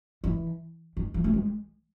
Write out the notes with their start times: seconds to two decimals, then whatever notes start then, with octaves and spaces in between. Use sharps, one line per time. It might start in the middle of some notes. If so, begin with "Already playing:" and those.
0.24 E3
0.97 D#3
1.14 E3
1.24 A3
1.34 G#3